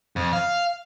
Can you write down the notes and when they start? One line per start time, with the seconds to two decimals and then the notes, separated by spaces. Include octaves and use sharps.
0.16 F2
0.33 F5